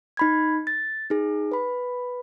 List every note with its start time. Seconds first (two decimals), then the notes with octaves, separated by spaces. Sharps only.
0.17 D#4 B5 G#6
0.67 A6
1.10 D#4 G#4
1.52 B4 B5